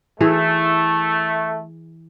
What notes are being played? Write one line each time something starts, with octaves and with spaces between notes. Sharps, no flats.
E3 A3 G#4